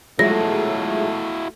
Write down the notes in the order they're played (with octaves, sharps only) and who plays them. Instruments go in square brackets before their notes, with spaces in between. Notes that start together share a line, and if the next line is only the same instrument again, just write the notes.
[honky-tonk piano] F3 F#3 G#3 [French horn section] A3 [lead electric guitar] E4 F#4 [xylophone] A#6